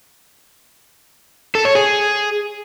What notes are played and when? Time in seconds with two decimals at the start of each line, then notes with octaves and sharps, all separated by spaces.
1.55 A4
1.65 C#5
1.75 G#4